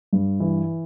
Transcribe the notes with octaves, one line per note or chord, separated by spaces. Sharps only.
G2
E3